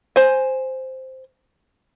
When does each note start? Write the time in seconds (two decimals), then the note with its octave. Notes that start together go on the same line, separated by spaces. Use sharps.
0.16 C5 G#5